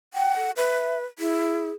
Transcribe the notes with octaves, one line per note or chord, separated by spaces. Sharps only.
F#5 G5
A4
B4 E5
E4 G#4